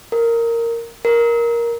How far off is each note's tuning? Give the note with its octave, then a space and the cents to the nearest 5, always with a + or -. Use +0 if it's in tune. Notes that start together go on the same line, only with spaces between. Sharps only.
A#4 -10
A#4 +10